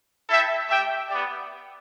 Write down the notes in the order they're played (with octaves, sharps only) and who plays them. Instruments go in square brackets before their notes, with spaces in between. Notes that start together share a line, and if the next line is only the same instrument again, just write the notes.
[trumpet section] E4 A4 E5 G5
A3 G4 E5 G5
B3 G4 D5